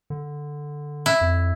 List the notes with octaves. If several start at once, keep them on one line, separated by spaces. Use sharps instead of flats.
D3
E4
F2